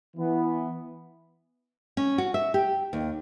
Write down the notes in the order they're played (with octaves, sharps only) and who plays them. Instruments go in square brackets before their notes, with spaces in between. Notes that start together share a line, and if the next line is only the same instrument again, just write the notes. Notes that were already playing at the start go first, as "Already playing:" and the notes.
[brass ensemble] E3 B3
[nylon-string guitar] C#4
F#4
E5
G4
D#2